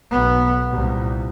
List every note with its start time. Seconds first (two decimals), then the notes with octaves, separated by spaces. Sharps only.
0.11 B1 B3
0.70 C2 A#2